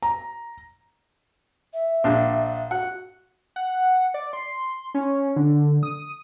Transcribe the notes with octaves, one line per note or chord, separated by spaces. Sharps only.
A#5
E5
A#1 D4
F#4 F#5
F#5
D5
C6
C#4
D3
D#6